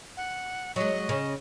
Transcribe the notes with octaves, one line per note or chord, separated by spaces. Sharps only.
F#5
F#3 G#3 D#5
C#3 C#4